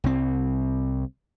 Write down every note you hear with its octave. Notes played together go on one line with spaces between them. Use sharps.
C2 C4